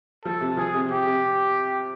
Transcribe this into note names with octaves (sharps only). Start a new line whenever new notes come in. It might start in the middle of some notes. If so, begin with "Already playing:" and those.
F3 A4
C3
F3 G#4
C3
C3 G4
C3